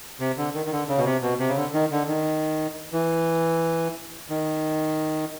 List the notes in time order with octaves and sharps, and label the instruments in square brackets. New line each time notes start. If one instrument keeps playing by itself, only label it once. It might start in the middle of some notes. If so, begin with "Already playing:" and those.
[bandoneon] C3
D3
D#3
D#3
D3
C#3
B2
C3
B2
C3
C#3
D3
D#3
D3
D#3
E3
D#3